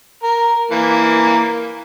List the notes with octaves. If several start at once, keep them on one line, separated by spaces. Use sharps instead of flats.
A#4
E3 A#3